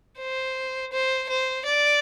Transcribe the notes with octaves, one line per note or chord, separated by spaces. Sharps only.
C5
C5
C5
D5